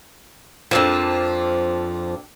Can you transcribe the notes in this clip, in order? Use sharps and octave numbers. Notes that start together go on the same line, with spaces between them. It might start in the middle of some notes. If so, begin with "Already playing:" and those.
F2 F3 A#3 C4 D4